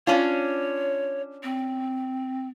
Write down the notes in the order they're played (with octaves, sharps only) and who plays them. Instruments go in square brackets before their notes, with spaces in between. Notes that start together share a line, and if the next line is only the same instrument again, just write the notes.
[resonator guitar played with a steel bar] C#4 D4 F4 [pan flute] C#5
[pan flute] C4